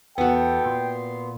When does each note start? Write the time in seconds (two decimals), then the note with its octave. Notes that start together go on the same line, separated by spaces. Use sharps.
0.18 E2 B3 F#4 A4 G5
0.65 A#2 C6